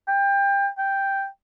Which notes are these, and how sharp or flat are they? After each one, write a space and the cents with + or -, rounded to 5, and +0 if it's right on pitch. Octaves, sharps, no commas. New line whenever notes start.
G5 +25
G5 +0